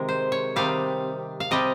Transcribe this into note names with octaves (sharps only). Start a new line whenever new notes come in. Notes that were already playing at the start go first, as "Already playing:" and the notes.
Already playing: C3 D#3 G#3 A#4
C5
C#5
C3 D#3 G3 F5
F5
C3 G3 D#5